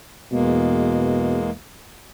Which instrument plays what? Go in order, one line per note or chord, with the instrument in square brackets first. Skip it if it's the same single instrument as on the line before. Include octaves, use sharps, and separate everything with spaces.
[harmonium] E2 G#3 A#3 [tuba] B2